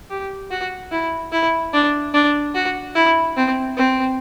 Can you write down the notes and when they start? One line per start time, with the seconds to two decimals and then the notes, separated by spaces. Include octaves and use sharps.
0.10 G4
0.50 F#4
0.92 E4
1.32 E4
1.73 D4
2.14 D4
2.55 F#4
2.95 E4
3.37 C4
3.77 C4